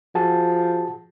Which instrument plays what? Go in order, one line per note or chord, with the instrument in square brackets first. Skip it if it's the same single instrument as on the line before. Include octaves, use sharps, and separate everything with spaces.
[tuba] F3 [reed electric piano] F#4 G#4 A5